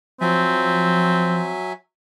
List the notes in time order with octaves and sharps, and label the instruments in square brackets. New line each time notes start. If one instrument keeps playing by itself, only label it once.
[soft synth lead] F3 [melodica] F#3 E5 G#5 [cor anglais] C4